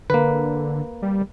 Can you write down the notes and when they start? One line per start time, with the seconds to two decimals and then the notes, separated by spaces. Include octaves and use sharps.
0.10 D3 A#3 B4
1.02 G3